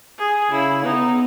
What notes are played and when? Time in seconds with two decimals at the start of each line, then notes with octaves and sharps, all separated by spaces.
0.18 G#4
0.51 C#3 E4
0.84 B3 D#4